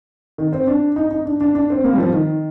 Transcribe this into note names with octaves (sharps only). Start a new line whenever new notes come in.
D#3
C4
D4
D#4
D#4
D4
D4
D4
C4
A#3
G3
F3
D#3